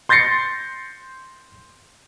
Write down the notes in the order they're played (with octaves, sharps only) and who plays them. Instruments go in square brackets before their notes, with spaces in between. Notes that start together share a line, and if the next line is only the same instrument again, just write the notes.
[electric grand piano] C6 G6 A6 A#6 C7 C#7